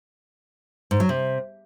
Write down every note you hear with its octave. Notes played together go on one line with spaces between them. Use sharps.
G#2
F#3
C3